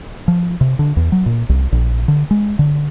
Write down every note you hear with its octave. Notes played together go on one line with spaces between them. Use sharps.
F3
C3
D3
E2
F#3
A#2
C2
A#1
D3
G#3
D3